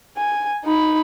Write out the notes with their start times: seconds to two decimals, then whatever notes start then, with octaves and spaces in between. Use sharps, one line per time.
0.17 G#5
0.65 D#4 B5